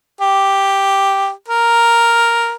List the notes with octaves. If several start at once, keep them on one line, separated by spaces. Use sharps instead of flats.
G4
A#4